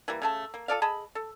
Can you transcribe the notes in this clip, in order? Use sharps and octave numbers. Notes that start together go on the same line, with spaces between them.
E3 G3 A#3
C#3 A3 A5
A#3
F4 A4 D5 F5
G#4 D#5 A5 B5
A4